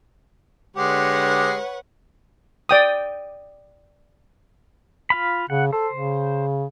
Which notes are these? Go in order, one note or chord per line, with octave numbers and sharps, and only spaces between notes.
D3 G#3 G4 B4 C#5 F#5
D5 G5 D#6
F4 F5 B5
C#3 F#5
A4 C5
C#3